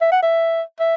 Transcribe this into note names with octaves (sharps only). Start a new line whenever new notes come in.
E5
F#5
E5
E5